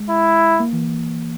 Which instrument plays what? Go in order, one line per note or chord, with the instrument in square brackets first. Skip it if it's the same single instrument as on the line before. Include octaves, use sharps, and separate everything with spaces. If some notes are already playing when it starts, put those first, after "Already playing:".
Already playing: [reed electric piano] G#3
[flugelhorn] E4
[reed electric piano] A#3
E3